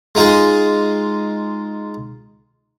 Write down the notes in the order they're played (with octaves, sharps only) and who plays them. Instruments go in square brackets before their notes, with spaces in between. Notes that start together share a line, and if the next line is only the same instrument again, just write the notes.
[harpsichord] G#3 D#4 F4 G#4